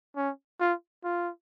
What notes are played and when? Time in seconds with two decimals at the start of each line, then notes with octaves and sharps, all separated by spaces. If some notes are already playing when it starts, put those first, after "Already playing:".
0.17 C#4
0.60 F4
1.04 F4